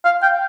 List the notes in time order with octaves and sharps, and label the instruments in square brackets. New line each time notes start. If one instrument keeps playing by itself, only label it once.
[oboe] F5
G5